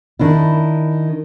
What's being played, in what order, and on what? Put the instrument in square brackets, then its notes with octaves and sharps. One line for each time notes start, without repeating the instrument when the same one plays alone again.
[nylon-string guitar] D#3 D4 E4